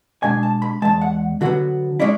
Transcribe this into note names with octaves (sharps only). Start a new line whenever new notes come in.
B2 G#3 D4 G#5
A5
B5
E2 C#3 G#3 A5
F#5
D3 F#3 B3 F#4
G#3 C#4 E4 D5